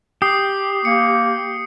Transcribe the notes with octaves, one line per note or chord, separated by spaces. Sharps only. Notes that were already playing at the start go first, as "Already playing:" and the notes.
G4 D#6 C7
A#3 C#7